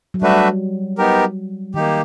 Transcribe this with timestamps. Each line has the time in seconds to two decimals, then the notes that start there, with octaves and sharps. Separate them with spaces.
0.14 F#3
0.22 G3 A3 D4 F#4 B4 E5
0.98 B3 D#4 G4 A#4
1.74 D#3 A#3 D#4 G4